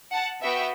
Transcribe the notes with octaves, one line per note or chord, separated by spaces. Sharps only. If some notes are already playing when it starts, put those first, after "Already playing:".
F#5 A5
B3 F#4 E5 G5